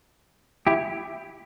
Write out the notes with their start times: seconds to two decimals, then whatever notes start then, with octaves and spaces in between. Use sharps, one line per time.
0.67 E4 G4